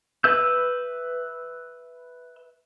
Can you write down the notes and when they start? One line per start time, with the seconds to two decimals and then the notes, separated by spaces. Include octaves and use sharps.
0.24 B4 E5 E6 G6